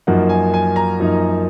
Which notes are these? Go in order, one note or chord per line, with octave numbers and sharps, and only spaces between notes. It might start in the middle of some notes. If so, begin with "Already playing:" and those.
F#2 F3 A#3 D#4 F#5
G#5
G#5
A#5
F#2 F3 A#3 D#4